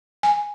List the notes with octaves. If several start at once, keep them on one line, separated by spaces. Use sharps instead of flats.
G#5